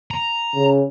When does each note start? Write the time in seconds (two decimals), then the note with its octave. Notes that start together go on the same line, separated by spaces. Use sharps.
0.11 A#5
0.55 C#3